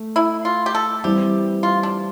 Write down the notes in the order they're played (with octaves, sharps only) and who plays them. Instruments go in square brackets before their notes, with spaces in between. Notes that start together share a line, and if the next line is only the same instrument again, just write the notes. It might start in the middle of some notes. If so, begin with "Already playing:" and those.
Already playing: [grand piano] A3
[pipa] E4
F4
G4
A4
[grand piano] E3 G3 C4 E4 [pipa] G4
[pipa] F4
D4